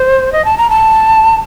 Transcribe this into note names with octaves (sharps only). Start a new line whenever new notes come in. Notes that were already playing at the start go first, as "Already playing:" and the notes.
Already playing: C5
D#5
A5
A#5
A5